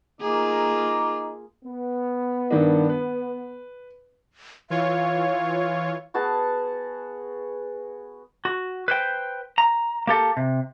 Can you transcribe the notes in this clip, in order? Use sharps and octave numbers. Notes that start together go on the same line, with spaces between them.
A#3 D#4 F4 G#4 A#5 D6
B3
G2 D#3 D4
B4
E3 F4 C#5 F5
B3 F#4 G#4 A5
F#4
B4 C5 G5
A#5
A#3 G4 A4
C3